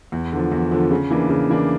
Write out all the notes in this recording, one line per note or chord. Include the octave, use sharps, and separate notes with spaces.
E2
D3 F3
E2
D3 F3
C#3
E3 A#3 D4
C#3
E3 A#3 D4